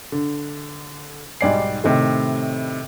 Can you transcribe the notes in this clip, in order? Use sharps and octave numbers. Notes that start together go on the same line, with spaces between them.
D3
B1 G#2 G3 D5 G#5 C7
A2 C3 D#3 A3